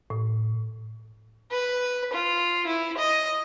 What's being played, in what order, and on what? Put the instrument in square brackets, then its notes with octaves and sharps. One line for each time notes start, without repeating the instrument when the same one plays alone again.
[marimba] A2
[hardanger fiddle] B4
F4
E4
D#5